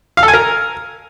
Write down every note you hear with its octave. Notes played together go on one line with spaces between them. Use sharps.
F5
A4
G#5
A#4